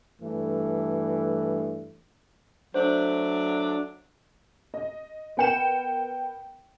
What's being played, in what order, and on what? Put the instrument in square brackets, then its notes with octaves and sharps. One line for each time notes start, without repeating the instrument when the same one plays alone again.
[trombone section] G2 E3 A3
[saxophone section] F#3 A3 D4 [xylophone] C5
[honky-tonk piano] D#5
B3 A#4 G5 C#7 E7